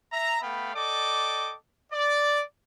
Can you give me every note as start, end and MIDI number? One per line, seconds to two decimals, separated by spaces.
0.13 0.41 76
0.13 0.41 82
0.42 0.74 57
0.42 0.74 59
0.42 0.74 77
0.42 0.74 79
0.42 0.74 83
0.75 1.54 69
0.75 1.54 74
0.75 1.54 75
0.75 1.54 79
0.75 1.54 86
1.93 2.42 74